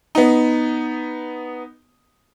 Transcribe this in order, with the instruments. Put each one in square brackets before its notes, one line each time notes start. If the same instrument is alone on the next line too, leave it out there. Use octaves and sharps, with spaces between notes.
[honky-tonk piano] B3 D#4